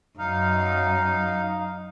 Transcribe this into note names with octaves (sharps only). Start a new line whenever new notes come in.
F#2 D#4 F5